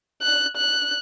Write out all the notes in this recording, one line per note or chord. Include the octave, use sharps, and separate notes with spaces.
F#6
F#6